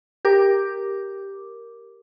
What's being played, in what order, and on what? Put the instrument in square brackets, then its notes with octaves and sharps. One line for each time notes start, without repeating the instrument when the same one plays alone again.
[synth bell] G4 A#4 D6